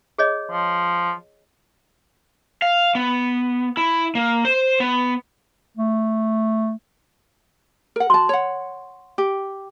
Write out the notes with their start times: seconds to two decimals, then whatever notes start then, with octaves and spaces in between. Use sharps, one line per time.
0.18 G#4 C#5 D#5
0.50 F3
2.62 F5
2.95 B3
3.77 E4
4.15 A#3
4.45 C5
4.80 B3
5.77 A3
7.96 A#4 F#5
8.10 F#4 A5 C6
8.29 C#5 F#5
9.18 G4